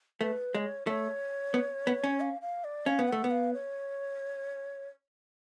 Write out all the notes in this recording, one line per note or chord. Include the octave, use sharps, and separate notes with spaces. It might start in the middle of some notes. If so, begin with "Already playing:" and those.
A3 B4
G#3 C#5
A3 C#5
B3
B3
C#4
F5
F5
D5
C#4 F5
B3
A3 F#5
B3
F5
C#5